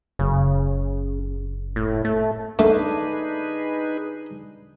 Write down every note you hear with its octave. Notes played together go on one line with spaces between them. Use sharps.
F#1 C#3
A2
A3
A3 D4 D#4 G#4 B4